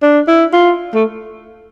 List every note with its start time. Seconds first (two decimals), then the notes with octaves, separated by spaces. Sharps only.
0.02 D4
0.28 E4
0.53 F4
0.94 A3